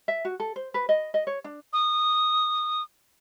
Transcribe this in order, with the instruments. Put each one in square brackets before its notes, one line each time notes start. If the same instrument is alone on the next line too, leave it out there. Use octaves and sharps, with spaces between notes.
[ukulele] E5
F#4
A4
C5
B4
D#5
D#5
C#5
D4
[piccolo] D#6